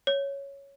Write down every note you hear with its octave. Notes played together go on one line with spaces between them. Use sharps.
C#5